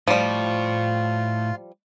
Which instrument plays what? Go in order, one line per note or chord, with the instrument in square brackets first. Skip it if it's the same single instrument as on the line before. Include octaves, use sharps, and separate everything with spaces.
[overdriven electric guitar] A2 [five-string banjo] F3 G3 [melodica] F4